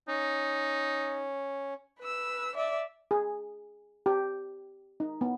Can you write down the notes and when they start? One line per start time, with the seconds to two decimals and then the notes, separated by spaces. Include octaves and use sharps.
0.08 C#4 D#4
2.00 B4 E6
2.55 D5 E5
3.11 G#4
4.06 G4
5.00 D#4
5.21 B3